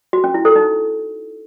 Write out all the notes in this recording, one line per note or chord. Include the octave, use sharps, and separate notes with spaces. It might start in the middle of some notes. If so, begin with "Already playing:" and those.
F#4
C#4
E4
A4
D#4